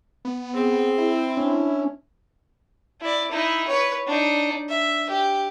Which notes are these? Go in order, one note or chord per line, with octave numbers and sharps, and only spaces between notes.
B3
C4 G#4
E4
C#4 D4
E4 D5
D#4 E4
B4 C#5
D4 D#4
E5
G4